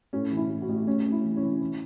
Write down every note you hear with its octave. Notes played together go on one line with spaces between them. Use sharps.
A2 C#4
E3
E4
A2
F#4
A1
A2 C#4
A1
E4
E3
C#4
E3
E3